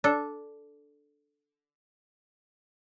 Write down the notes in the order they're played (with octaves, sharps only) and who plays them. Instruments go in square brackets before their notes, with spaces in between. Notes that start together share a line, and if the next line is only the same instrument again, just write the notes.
[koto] D4 A4